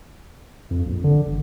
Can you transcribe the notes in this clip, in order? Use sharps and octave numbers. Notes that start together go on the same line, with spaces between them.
F2
A#1
D3
G1